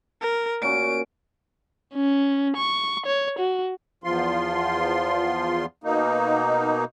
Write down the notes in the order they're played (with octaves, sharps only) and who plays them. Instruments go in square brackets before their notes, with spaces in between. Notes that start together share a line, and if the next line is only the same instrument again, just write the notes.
[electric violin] A#4
[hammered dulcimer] A#2 C#4 F#4 [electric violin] D7
[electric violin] C#4
C#6
C#5
F#4
[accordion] E2 F3 F4 C6
B2 A#3 D#4